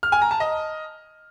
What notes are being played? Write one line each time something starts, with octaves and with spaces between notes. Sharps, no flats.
F6
G#5
A#5
A5
D#5